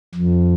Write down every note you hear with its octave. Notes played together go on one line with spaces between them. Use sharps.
F2